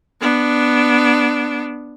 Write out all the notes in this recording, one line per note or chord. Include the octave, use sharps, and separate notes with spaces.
B3 D4